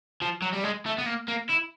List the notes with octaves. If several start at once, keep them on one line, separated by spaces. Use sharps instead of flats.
F3
F#3
G3
G#3
A3
B3
A#3
A#3
E4